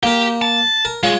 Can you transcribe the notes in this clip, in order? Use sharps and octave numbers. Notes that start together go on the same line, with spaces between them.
A#3 G4 A#4
A5
A#4
G#3 F4 C#5